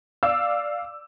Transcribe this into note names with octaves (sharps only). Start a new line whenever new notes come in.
D5 F5 D6 E6